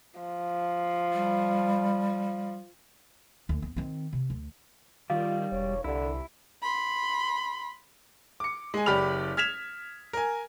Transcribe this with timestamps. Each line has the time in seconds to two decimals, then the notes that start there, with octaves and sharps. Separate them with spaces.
0.19 F3
1.13 G3
3.49 D2
3.62 B3
3.76 D#3 C4
4.13 C3
4.30 D2
5.10 D#3 G3 F4 D5 F5
5.52 E1 C#5
5.84 C2 D3 E4
6.62 B5 C6
8.40 D6 C#7
8.74 G#3 G#5
8.86 F#1 G4 D5 B5 F6 F7
9.37 F6 G#6 B6 E7 F7
10.13 A#4 G#5